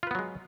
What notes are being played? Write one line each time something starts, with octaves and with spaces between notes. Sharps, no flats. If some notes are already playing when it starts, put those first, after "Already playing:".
F#3 G#3 B3 F4 B4